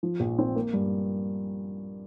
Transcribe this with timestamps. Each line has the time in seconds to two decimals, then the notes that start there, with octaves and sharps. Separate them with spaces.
0.03 F3
0.20 A#1
0.39 C4
0.56 A#3
0.73 G2